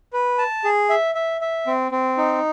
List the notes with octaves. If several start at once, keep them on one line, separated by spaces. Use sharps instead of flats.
B4
A5
G#4
E5
E5
E5
C4
C4
D#4